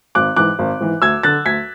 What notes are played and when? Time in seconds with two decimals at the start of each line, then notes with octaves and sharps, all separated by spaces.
0.15 G#1 D6 F#6
0.36 G#2 E3 D6 F#6
0.59 G#1
0.81 G#2 E3
1.02 D2 E6 G#6
1.23 D3 F#6 A6
1.45 D2 G#6 B6